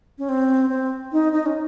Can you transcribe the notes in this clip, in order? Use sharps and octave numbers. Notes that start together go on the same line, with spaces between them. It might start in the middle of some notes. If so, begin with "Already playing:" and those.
C#4
C4
C4
D#4
D#4
C#4